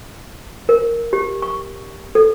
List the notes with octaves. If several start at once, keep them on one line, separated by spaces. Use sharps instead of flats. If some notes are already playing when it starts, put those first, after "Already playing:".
A#4
G4
C#6
A4